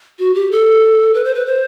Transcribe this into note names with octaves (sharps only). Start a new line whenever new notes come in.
F#4
G4
A4
B4
C5
B4
C5